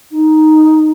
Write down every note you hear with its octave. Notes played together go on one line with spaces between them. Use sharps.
D#4